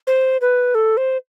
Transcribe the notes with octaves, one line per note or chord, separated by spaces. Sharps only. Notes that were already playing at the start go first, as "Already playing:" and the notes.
C5
B4
A4
C5